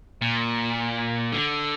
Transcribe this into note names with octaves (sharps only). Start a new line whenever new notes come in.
A#2
D3